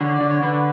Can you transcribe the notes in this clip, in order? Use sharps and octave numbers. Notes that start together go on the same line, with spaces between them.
D3 C#5
D5
D3
C#5
D3 B4